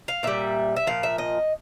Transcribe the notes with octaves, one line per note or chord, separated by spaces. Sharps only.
F5
A#2 G3 E5
E5
A#2 F3 F5
E5
D#5